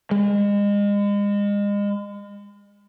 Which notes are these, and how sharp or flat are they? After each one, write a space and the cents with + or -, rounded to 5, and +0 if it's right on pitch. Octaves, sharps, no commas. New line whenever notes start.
G#3 -35